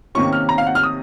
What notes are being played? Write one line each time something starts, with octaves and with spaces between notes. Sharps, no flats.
C3 D#3 A#3 C#4 C#6
F6
A#5
F5
F#5
F6
D#6